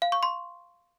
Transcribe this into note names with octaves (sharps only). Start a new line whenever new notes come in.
F5
C#6
C6